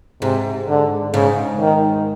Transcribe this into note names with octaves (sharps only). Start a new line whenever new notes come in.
G#2 C3
D3
G#2 C#3
D#3